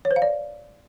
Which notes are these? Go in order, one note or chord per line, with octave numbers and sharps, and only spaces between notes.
C#5
C5
F5
D5